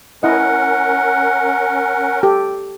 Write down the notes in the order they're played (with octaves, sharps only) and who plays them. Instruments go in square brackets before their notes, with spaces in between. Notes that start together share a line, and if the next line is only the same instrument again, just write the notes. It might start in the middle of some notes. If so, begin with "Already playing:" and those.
[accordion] C#4 A#4 [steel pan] E4 D#5 [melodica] F#5
[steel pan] G4 A4